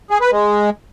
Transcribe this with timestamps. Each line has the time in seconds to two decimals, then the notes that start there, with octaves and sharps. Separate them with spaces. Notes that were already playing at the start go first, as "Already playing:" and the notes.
0.10 G#4
0.21 B4
0.32 G#3